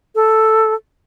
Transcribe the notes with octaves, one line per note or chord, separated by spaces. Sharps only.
A4